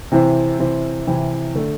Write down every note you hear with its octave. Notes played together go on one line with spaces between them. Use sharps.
C3 E3 C4 E4
C3 E3 C4 E4
C3 E3 C4 E4
D3 A3